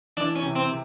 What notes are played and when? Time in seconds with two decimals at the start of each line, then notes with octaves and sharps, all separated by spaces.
0.17 E3 D4
0.36 C#4
0.43 C3
0.56 C4
0.69 C3